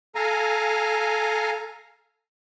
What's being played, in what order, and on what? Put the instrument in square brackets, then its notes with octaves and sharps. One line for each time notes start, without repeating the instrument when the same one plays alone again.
[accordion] A4 F5 G#5 A#5